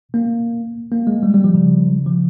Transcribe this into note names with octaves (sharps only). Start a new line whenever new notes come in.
A#3
A#3
G#3
G3
G3
F3
C#3
F3